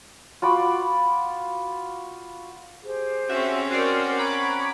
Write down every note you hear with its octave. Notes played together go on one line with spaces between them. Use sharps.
F4 F#4 B5 D6
G4 G#4 C5
C4 C#4 F#4 E5
F#4 A#4 C5 D5
F#5 A#5 B5 C#6 D6 G#6